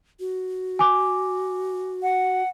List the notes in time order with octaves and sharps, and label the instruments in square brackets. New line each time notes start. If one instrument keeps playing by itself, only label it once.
[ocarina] F#4
[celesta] G#5 D6
[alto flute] F#5